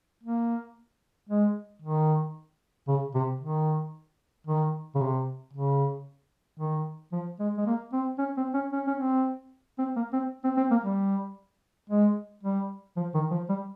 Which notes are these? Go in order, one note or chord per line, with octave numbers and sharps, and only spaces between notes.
A#3
G#3
D#3
C#3
C3
D#3
D#3
C#3
C3
C#3
D#3
F3
G#3
G#3
A#3
C4
C#4
C4
C#4
C#4
C#4
C4
C4
A#3
C4
C4
C4
A#3
G3
G#3
G3
F3
D#3
F3
G3